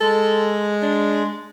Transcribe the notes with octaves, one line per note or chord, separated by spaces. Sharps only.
G#3 A4
D4